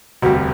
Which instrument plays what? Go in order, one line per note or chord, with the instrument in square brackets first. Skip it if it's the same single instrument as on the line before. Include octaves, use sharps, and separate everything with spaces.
[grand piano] E1 D2 C3 G3 [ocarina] F#4